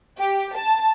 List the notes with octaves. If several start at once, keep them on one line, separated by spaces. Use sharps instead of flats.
G4
A5